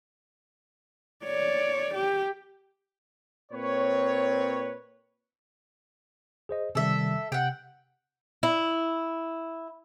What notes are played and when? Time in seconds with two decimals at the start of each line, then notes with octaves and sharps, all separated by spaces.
1.25 C#5 D5
1.94 G4
3.51 A#2 C4 B4 C#5
6.49 G#4 C5 D#5
6.75 C3 D#3 G3 A4 E5
7.32 C3 F#5 G5
8.43 E4